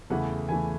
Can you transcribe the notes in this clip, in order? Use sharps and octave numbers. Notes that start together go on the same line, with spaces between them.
E2 C#3 E3 A3 F#5
E2 C#3 E3 A3 G#5